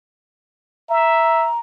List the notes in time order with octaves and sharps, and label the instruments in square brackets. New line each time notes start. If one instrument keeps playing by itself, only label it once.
[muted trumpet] E5 [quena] A#5